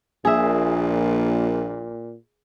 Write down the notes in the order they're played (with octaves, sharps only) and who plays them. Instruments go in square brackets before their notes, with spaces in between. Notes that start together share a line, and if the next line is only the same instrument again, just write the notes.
[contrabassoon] A#1 [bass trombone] A#2 [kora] G#4 E5